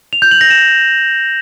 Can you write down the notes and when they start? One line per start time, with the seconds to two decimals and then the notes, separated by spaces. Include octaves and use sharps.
0.13 F7
0.22 G6
0.31 F#7
0.41 A#6
0.50 E7